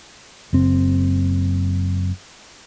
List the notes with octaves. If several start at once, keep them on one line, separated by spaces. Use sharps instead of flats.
F#1 C4